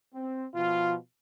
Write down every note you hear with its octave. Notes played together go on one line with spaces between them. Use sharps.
C4
B2 F3 F4